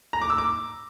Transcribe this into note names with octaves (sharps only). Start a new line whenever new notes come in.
A#5
D6
E6
D6